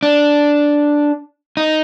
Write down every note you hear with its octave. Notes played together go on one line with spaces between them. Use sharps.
D4
D#4